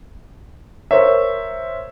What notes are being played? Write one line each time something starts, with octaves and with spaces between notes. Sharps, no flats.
A#4 C5 C#5 E5